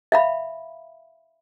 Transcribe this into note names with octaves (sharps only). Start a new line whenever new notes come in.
E5 F5 B5